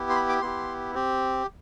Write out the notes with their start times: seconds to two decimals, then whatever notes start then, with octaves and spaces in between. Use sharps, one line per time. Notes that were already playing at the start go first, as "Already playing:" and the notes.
Already playing: B3 E4 G4
0.10 C6
0.16 B5
0.29 D6
0.42 B3 E4 G4 C6
0.94 C4 G4